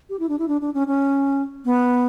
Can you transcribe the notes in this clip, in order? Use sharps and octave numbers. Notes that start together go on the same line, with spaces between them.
G4
E4
D4
E4
D4
D4
C#4
C#4
B3